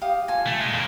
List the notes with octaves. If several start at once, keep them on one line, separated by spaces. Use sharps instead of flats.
G4 F5 D#6
F4 A4 G#5
A3
A#2 G#3
A2 A#3